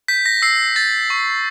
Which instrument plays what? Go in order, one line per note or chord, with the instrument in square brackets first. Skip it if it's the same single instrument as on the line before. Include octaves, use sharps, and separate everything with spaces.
[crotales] G6 B6
A#6
E6 C7
G6 A6
C#6